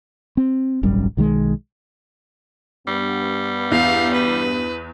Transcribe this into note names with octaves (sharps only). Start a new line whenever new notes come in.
C4
D#1 G#1 F#2 G3
B1 D#3 F#3 G#3
G2 G3 B3
E2 F5
B4